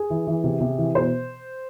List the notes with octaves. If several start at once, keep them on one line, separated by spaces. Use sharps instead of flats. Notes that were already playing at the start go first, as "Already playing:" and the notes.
Already playing: G#4
E3
E3
C3
C3
E3
B2 C5